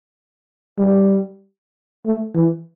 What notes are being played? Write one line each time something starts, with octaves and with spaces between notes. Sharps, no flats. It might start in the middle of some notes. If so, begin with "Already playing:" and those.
G3
A3
E3